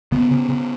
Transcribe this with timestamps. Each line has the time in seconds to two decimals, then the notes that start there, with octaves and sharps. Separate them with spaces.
0.12 C#3 B3
0.31 C#3
0.50 C#3